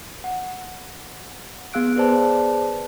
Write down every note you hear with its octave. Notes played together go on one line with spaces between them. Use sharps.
F#5
B3 G#4 F5 E6 F#6 D7
G#4 B4 C5 D5 A5